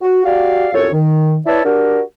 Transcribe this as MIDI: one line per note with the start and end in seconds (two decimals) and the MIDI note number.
0.01 0.20 66
0.25 0.68 66
0.25 0.68 67
0.25 0.68 74
0.25 0.68 77
0.73 0.89 36
0.73 0.89 42
0.73 0.89 65
0.73 0.89 69
0.73 0.89 73
0.92 1.37 51
1.46 1.63 64
1.46 1.63 71
1.46 1.63 73
1.46 1.63 74
1.46 1.63 76
1.46 1.63 81
1.64 2.01 62
1.64 2.01 66
1.64 2.01 67
1.64 2.01 70